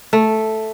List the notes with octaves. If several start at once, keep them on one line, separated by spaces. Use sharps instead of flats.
A3